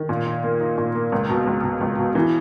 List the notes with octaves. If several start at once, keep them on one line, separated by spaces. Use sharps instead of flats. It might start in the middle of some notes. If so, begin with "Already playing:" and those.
Already playing: D#3
A#2
D#4
A#3
D#4
A#2
A#3
C#2
B2
C#2
B2
C#2
B2
E3